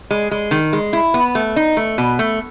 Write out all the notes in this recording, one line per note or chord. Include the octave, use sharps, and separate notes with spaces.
G#3
G#3
D#3
G#3
E4
B3
A3
D#4
A3
B2
A3